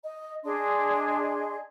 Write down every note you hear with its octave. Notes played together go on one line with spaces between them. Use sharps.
D#5
D4 G#4 D#5 C6